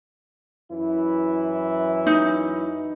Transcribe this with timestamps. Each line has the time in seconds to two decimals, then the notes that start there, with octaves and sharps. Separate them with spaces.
0.71 F#2 E3 E4
2.07 D#4